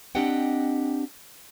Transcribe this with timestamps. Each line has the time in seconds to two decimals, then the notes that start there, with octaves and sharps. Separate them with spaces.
0.15 C4 D4 G4 D#5 F#5 G5